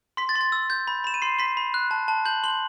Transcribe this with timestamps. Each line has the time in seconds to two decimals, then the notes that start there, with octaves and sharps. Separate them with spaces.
0.17 C6 B6
0.29 A6
0.35 C6
0.41 A6
0.52 E6
0.70 G6
0.88 B5
1.04 B5 E7
1.14 D#7
1.22 C6 C7
1.39 C6 B6
1.57 B5
1.74 F#6
1.91 A5
2.08 A5
2.25 G6 F#7
2.44 C6 F#7